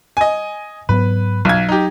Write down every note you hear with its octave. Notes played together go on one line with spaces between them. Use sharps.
D#5 G#5
G#2 F#3 B3 B4
B1 F#3 G#6
D#4 G4